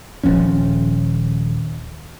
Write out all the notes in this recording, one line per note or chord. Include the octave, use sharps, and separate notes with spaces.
D#1 F3 C#4